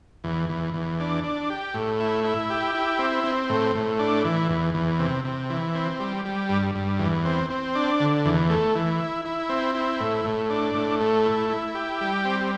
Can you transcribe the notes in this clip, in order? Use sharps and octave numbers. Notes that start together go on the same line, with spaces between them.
E2
E2
E2
D4
D4
G4
A2
E4
E4
G4
E4
C4
C4
A2
A2
D4
E3
E2
E2
C3
C3
E3
C4
G3
G3
G2
G2
E2
C4
C4
D4
D3
E2
A3
E3
E4
E4
C4
E4
A2
A2
D4
A2
A3
E4
E4
G4
G3
C4